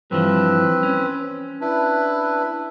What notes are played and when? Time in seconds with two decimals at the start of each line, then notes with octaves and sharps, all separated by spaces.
0.11 G2 E3 F3 C4 B4
0.83 C#4
1.61 D4 E4 B4